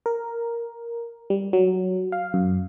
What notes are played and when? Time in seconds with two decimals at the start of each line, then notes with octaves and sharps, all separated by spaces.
0.06 A#4
1.30 G3
1.53 F#3
2.12 F5
2.34 F#2